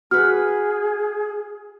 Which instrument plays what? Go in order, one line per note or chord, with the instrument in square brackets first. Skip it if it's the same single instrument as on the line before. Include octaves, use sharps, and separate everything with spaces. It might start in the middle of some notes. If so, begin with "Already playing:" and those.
[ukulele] F#4 B4 [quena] G#4 [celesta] F6